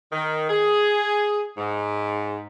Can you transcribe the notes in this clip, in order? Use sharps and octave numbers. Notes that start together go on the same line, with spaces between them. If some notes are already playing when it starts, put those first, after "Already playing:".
D#3
G#4
G#2